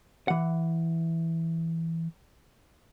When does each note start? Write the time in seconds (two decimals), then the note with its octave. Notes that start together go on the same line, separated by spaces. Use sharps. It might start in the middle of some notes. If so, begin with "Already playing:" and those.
0.28 E3 F#5